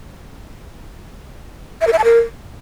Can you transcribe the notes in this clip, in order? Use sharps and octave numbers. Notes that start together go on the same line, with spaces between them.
E5
A#4
E5
A5
A#4